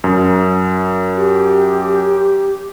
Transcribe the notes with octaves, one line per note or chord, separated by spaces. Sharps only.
F#2
G4